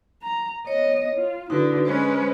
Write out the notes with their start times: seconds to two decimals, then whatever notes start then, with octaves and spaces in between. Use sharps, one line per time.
0.23 A#5
0.67 B3 C#5 D#5
1.15 F4
1.50 D3 D#4 E4 F#4 B4
1.85 G#3 C#4 B4 C5